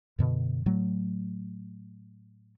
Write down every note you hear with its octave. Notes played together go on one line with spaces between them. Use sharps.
F#2 B2 D3
A2 F#3 A3